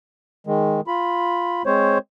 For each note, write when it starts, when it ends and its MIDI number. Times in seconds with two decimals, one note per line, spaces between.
0.47 0.81 51
0.47 0.81 56
0.87 1.63 65
0.87 1.63 83
1.66 1.98 56
1.66 1.98 60
1.66 1.98 72
1.66 1.98 73